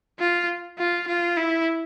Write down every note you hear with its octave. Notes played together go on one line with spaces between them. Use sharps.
F4
F4
F4
E4